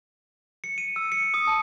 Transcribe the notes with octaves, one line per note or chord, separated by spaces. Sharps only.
C#7
D#7
E6
C#7
D#6
A5